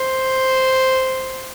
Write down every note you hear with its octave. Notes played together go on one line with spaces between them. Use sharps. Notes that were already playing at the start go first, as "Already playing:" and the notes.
Already playing: C5